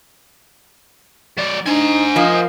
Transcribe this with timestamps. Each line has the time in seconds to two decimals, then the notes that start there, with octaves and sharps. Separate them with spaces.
1.38 F#3 D5
1.66 D4 D#4 C5 G#5
2.16 F3 A#3 D#5